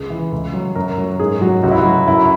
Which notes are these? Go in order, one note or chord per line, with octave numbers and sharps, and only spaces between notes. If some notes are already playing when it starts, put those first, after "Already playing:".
Already playing: C#2 G#4
E3
C#2
F#3
F#2 A#4
F#3
G#2 G#4
F#3 F#4
C#2 F#4
E4
F#4
F#3
F#2 E4